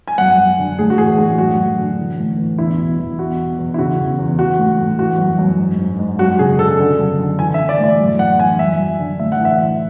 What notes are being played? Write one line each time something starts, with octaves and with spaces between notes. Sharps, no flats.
G#5
F#2 F#5
F#2
D3
A2 G#4
F#4
E3 G#4
A2 F#4
F#2 F#4
F#2
D3
E3
A2
E3
E2 E4
B2
E2
B2 F#4
B2
E2
E4
C#3 F#4
E2
E2
E3 F#4
A2
A2
E3 F#4
F#2
F#2
G#2
G#2
G#2
F#2 F#4
C#3 G#4
C#3 A4
D3
F#2
D3
E3 G#5
E5
E3
D5
A2 D5
F#2
E3 F#5
E3 G#5
F#2 E5
F#2
D3
A2 E5
F#5
E3
E5
E3